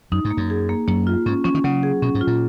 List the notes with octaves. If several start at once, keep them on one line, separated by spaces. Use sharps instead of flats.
F#2 D#4
G#2
A#3
F#2
G#4
A#3
F#2 A#3
F4
G#2 C#4
F3 C#4
D#3
C#3 F#3
G#4
B2 C#4
G#2
F4
A#2